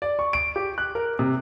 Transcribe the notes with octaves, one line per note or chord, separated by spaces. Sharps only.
D5
C#6
D7
G4
F#6
A#4
C3